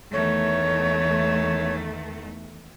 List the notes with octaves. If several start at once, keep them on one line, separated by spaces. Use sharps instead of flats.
E2 D#3 A3 C#5